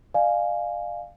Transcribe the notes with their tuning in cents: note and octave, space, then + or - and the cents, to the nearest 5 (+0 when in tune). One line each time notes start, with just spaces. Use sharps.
D5 +40 F5 +0 G#5 +10